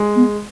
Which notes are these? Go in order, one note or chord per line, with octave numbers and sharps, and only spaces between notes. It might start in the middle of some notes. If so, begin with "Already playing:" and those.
Already playing: G#3
B3